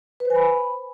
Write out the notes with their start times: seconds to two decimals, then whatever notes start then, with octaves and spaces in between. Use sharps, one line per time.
0.20 B4
0.25 C5
0.30 G#5
0.35 B5